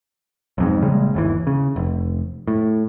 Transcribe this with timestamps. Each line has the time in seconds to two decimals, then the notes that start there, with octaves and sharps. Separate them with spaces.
0.58 B1 F2 G#2
0.82 A#1 C#3 G3 G#3
1.14 G1 D#2 E3
1.47 C#3
1.76 F1
2.48 A2